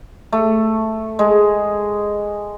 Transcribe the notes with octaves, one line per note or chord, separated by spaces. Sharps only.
A3
G#3